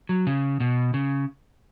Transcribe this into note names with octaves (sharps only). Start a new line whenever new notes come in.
F#3
C#3
B2
C#3